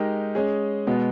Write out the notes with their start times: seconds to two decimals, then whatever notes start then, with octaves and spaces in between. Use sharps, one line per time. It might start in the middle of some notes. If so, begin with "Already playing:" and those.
Already playing: G#3 D#4 G4 A#4
0.35 G#3 C#4 G#4
0.87 B2 G#3 B3